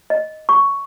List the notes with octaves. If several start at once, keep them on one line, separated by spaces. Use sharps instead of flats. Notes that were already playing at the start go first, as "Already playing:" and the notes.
D#5
C#6